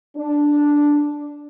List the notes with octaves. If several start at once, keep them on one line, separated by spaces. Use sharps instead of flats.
D4